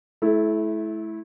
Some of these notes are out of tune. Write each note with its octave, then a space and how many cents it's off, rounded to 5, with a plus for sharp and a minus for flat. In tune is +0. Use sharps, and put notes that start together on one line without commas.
A3 -35 E4 -5